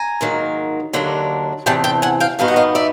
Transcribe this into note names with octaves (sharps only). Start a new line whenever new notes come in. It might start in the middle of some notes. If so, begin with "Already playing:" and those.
Already playing: G#5 A#5
G#2 D#3 F#3 A#3
D#2 D3 F#3 A#3 D4
E2 C3 E3 G5 A5
G5 A5
F#5 G#5
F5 G5
G2 D#3 F#3 B3 D#4 F5
F#5
D#5 F5
D5 E5